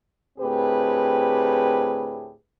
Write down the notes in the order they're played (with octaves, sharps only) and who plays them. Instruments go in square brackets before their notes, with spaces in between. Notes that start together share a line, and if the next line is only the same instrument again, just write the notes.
[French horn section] D2 A2 C4 G4 G#4 B4